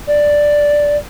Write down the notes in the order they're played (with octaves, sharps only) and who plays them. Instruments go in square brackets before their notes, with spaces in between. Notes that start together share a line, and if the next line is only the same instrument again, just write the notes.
[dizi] D5